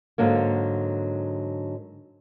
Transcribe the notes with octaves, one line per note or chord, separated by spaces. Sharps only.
G#2 D3 F#3 A#3